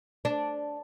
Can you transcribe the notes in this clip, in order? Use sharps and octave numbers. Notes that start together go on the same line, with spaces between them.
D4